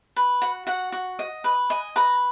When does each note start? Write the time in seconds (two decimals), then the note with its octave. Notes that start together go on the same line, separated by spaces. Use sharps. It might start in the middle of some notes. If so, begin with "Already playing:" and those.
0.16 B4
0.42 F#4
0.67 F#4 F#5
0.92 F#4
1.19 D#5
1.44 B4
1.70 D#5 G#5
1.96 B4 A#5